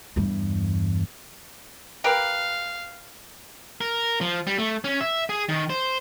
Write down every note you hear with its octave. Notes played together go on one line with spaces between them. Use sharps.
E2 G2
G4 A#4 B4 F5
A#4
F3
G3
A3
C#4
E5
G#4
D#3
C5